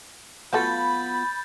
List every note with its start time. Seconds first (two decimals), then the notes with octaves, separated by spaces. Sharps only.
0.53 F#3 B3 F4 F#4 A4 B5 G6 A6